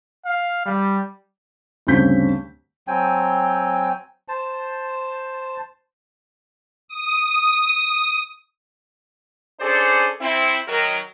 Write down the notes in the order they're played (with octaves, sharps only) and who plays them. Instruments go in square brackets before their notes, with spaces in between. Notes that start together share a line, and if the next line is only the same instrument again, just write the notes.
[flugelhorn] F5
G3
[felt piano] D2 G2 C#3 C4 G6 B6
[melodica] F#3 C4 G5 G#5
C5 A5
[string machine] D#6
[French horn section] C#4 D4 G#4 A4 C5 D5
C4 E4
D#3 F#3 A#4